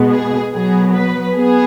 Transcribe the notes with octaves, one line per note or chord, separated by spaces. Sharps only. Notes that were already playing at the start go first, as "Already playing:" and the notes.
Already playing: B2 G#3 B3
G#4
B2 F#3 B3 G#4
B4
B3 G#4